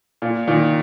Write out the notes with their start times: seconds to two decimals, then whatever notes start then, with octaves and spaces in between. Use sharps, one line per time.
0.22 A#2
0.47 A#2 D#3